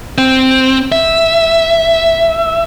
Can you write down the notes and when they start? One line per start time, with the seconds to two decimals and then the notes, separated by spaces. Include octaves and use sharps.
0.18 C4
0.92 E5